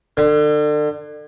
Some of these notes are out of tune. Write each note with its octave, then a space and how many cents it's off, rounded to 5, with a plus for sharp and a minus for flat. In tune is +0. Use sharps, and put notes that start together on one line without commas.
D3 +35